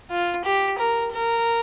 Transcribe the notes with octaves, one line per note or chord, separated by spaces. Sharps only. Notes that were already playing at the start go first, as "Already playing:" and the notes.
F4
G4
A#4
A#4